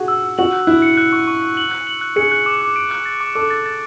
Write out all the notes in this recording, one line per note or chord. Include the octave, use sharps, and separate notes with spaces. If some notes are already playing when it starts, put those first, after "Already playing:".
Already playing: F#4 G#4
E6
E6
F#4 F#7
F#6
E4 F#6
C#7
F#6
C#6
C#6
C#6
F#7
F#6
F#7
F#6
G#4 C#7
F#6
D6
D6
D7
F#6
A6
D6
A4 D6
A6
A6